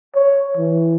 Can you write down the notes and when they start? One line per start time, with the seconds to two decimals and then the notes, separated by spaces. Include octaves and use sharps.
0.15 C#5
0.57 E3